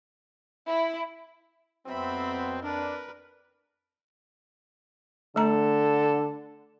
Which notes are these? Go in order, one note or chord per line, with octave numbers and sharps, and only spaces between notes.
E4
F2 F#3 B3 C4 E5 B5
D4 A#4 B4
D3 A3 A4 A#5